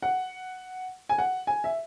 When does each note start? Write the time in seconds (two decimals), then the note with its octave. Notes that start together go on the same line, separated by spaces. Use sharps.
0.02 F#5
1.09 G#5
1.18 F#5
1.47 G#5
1.64 E5